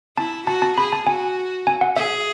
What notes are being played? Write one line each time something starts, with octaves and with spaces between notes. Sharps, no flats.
E4 A5
F#4 A5
A5
G#4 B5
A5
F#4 G#5
G#5
F#5
G#4 E5